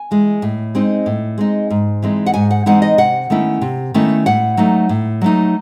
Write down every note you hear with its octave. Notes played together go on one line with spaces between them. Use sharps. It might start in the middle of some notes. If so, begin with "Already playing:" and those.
Already playing: G#5
E3 G#3
A2
G#3 C4 D#4
A2
G#3 C4 D#4
G#2
E3 G#3 C4 D#4
F#5
G#2 G#5
F#5
E3 G#3 C4 D#4 F#5
D#5
C3 F#5
D#3 A3 C#4 E4
C3
D#3 A3 C#4 E4
A2 F#5
F#3 A3 D#4
A2
F#3 A3 D#4